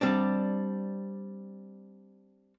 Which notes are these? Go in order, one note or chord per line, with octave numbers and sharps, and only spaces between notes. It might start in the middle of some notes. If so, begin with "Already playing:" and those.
G3 C4 D4